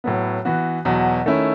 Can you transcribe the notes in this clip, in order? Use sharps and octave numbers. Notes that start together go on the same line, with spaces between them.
A2 F#3 B3
E3 B3 F#4
E2 B2 F#3
D#3 A3 C#4 E4